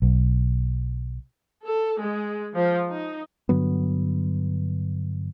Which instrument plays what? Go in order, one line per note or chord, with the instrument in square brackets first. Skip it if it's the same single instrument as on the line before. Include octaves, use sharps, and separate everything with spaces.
[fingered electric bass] B1
[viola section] A4
G#3
F3
D#4
[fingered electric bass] G2 D3 F#3 B3